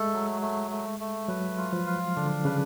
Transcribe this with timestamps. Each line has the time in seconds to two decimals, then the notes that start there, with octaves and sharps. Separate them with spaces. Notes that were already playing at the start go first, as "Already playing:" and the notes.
Already playing: G#3 A3 A4
0.13 F#3
0.41 A3
0.71 A3
1.00 A3
1.28 F#3 B4
1.58 F4
1.73 F3
1.87 F5
2.16 D3 D4
2.45 C#3 B4